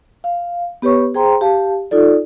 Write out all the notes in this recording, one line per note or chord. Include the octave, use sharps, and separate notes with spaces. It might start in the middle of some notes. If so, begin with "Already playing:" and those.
F5
B3 G4 B4 C#5 C#6
G#4 C5 G5 A#5 C6
G4 F5 A5
D#4 F4 A4 D5